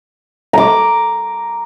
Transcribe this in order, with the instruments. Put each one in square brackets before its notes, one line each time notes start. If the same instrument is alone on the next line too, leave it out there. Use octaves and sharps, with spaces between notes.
[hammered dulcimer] A#5 D6